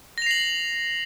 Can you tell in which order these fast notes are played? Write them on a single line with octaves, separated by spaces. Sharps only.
A#6 F7 C7 F#7